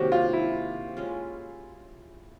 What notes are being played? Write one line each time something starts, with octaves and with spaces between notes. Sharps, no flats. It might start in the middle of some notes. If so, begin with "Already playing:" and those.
Already playing: C3 D#3 F#3 A#3 F#4 G4
F4
E4
G#3 C#4 F4